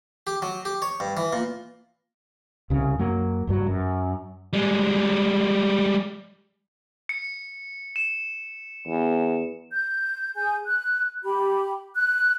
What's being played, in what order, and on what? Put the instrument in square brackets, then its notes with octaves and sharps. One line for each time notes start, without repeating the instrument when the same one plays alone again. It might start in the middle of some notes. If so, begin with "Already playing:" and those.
[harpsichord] G4
F#3
G4
C#5
G2
E3
A#2
[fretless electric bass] C2 C#3
F#2 F#3 A#3
F#1 G2 F#3
F#2
[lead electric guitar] G3 G#3
[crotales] C#7
E7
[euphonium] E2
[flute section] G6
G#4 G#5 G6
F#6
G4 B5
F#6